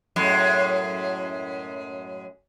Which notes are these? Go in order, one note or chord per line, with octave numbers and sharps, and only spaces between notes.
F#2 A2 G#3